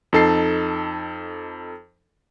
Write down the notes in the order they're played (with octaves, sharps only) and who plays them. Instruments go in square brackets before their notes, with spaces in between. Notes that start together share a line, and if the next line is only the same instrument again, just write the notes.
[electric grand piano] F2 D#4 A4 A5 C7